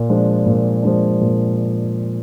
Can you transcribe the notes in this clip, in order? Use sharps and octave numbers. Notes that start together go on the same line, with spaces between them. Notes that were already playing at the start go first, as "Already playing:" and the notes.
Already playing: A#2
F3 G#3 D4
A#2
F3 G#3 D4
A#2